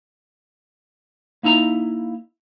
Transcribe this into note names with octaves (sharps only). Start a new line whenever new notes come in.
A#3 D#4 E4 A#5